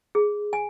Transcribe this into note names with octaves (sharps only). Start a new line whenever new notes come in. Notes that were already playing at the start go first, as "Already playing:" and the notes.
G#4
G#5